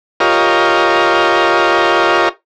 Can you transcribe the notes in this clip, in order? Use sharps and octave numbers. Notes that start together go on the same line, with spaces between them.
F4 G4 A#4 C#5 D#5